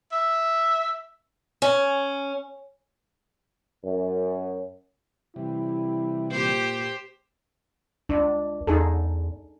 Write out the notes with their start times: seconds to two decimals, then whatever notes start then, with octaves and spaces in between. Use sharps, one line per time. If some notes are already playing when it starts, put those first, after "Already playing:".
0.12 E5
1.62 C#4
3.84 F#2
5.36 C3 E3 G3 E4
6.31 A#2 G4 C5
8.09 C#2 D4
8.67 E2 D#4 G#4 A4